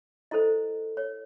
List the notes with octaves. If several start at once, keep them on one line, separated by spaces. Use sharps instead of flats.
E4 A4 C5 D#5
C#5